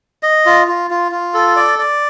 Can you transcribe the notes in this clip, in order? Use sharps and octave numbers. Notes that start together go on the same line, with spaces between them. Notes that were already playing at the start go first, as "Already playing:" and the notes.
D#5
F4
F4
F4
F4
A4
D5
D5